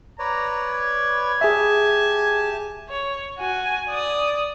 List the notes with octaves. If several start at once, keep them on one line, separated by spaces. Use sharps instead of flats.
B4 C#5 D5 A#5
G#6
G4 G#4 E5 G#5 A5
C#5
F#4 G#5
D5 D#6